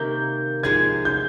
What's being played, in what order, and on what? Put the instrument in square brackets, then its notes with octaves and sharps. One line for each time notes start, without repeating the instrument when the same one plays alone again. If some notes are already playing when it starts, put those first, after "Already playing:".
Already playing: [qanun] C3 D#3 A#3 D#4 [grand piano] G6
[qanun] F3 G#3 D#4 G#4 [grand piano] G#6
[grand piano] G6